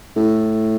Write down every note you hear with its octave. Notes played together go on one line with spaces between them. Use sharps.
A2